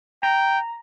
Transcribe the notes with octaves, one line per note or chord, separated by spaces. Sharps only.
G5 A#5